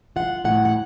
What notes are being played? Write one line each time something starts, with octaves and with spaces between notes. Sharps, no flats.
F4 F#5
A2 F#5
F#5